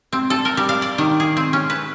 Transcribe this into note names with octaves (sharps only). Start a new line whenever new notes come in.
C4
A4
A#4
G3
F5
D5
D#3
G#4
C4
C#4
B4